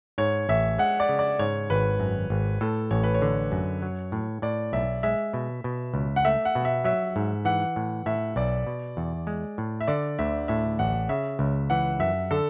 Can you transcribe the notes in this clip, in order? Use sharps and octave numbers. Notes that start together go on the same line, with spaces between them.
G#2 C#5
A1 E5
G#3 F#5
D5
C#3
D5
G#2 C#5
G#1 B4
F#2
G#1
A2 A4
A1 C#5
B4
C#5
D3
F#2
F#3
A2
A2 D5
B1 E5
G#3 E5
B2
B2
C#2
F#5
A3 E5
F#5
B2
E5
F#3 E5
G#2
E3 F#5
A2
A2 E5
B1 D5
B2
E2
G#3
A2
E5
D3 D5
D2 E5
A2 E5
A1 F#5
C#3 E5
C#2
E3 F#5
F#2 E5
D3 A4